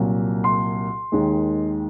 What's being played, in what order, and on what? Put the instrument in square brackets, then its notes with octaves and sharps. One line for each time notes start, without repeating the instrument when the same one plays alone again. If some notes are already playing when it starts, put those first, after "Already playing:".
Already playing: [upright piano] C2 A#2 F#3
C6
D#2 D#3 G#3